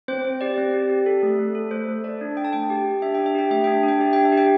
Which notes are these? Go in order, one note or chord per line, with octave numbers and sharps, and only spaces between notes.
C4 C5
C4
G4 D5
C4
G4
G4
A4
A3
A3
A4
A3 C5
A3
A4 D5
D4
D4 G5
A5
A3 G5
G4
G4
D4 E5
D4 G5
E5
G4 G5
A3 E5
D4 G5
E5
D4 G5
G4 E5
D4 G5
E5
G4
G5